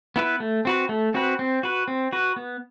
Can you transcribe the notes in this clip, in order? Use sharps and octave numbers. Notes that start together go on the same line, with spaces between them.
B3 E4 B4
A3
C4 F#4 B4
A3
C4 F#4 B4
C4
F#4 B4
C4
F#4 B4
B3